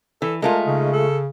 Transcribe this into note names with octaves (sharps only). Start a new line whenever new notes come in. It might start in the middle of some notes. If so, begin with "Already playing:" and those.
E3 A4
G#3 A3 F4 A#4
C#3 D#4
A4